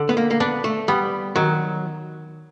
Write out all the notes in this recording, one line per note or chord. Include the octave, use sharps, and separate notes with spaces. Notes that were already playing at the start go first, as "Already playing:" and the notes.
Already playing: D3
B3
A#3
A#3
B3 D4
A3
G3 B3
D#3 F#3